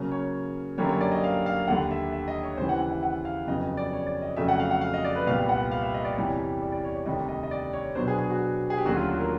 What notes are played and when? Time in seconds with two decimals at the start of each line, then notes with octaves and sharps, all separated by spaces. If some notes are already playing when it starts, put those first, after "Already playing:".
Already playing: C#3 F#3 A#3 C#4
0.11 C#5
0.78 F#2 D3 G3 A#3 C#5
0.89 C#5
1.01 D5
1.11 D#5
1.24 F5
1.46 F5
1.67 D#2 D3 G3 F#5
1.91 E5
2.13 E5
2.28 D#5
2.43 C#5
2.57 D#2 C#3 E3 G3 C5
2.69 F#5
2.80 F#5
2.92 E5
3.03 F#5
3.25 F5
3.47 F2 C#3 F#3 B3 D#5
3.63 D#5
3.77 D5
3.93 C#5
4.07 D5
4.22 D#5
4.37 F2 C#3 F#3 A3 E5
4.48 F#5
4.60 F5
4.71 F#5
4.81 F5
4.94 D#5
5.05 D5
5.16 B4
5.27 C2 A#2 G3 B3 F5
5.49 F#5
5.71 F5
5.82 E5
5.94 D#5
6.05 D5
6.16 E2 C3 E3 G3 C#5
6.62 D5
6.72 D5
6.84 C#5
6.96 C#5
7.06 D2 C3 D#3 G3 D#5
7.29 D#5
7.43 D#5
7.51 D5
7.73 C#5
7.95 B2 F#3 B3 D4 C5
8.08 G#4
8.18 G#4
8.30 F#4
8.70 G#4
8.78 G4
8.85 D#2 D3 F#3 A3 C#4 F#4
8.96 F4
9.08 F#4
9.19 A#4